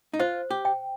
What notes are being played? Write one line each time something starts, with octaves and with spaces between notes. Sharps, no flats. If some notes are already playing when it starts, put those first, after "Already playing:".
D#4
F4 C5
G4
G5